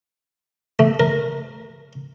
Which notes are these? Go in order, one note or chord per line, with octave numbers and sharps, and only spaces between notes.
A3
A#4